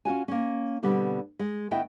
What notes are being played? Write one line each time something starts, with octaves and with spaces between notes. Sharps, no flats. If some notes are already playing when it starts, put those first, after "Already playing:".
C#4 F4 F#4 G#5
A#3 C#4
B2 D3 G3 B3 C4
G#3
D3 A3 B3 E4 D#5 G5